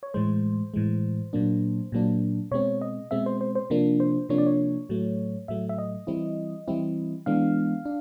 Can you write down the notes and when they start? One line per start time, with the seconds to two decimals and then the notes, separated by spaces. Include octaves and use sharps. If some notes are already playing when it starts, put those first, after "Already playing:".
0.03 C#5
0.14 A2 E3 G#3 C5
0.74 A2 E3 G#3
1.33 A#2 F#3 A#3 D4
1.92 A#2 F#3 A#3 D4
2.51 B2 G#3 C4 C#5
2.81 D#5
3.11 B2 G#3 C4 E5
3.26 C5
3.41 C5
3.55 C5
3.70 C3 F3 A#3 D4
4.00 C5
4.29 C3 F3 A#3 D4 C#5
4.38 D5
4.46 C#5
4.89 A2 F#3 A3
5.48 A2 F#3 A3 E5
5.69 E5
5.78 D#5
6.07 E3 G3 C4 E4
6.68 E3 G3 C4 E4
7.26 E3 G#3 B3 D4 F5
7.85 D4